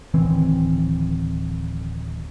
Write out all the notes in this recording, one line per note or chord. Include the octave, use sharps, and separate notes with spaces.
D1 D#3 E3 C4